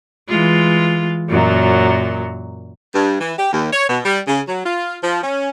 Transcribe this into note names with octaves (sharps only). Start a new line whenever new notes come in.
E3 G#3 F4
F#2 A#2 F#3
G2
E3
G4
D#2
C#5
B2
G3
C#3
F#3
F4
F3
C#4